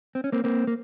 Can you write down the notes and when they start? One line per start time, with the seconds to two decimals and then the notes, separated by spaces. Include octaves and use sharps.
0.15 C4
0.24 C#4
0.32 A#3 C4
0.44 A#3 C4
0.67 A#3